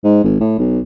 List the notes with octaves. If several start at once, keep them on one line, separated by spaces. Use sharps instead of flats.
G#2
G#1
A2
B1